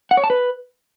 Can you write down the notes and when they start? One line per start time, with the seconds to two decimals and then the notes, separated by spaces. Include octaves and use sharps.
0.11 F#5
0.17 C#5
0.24 A5
0.30 B4